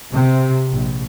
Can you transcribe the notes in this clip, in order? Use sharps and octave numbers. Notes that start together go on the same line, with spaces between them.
C3
A#1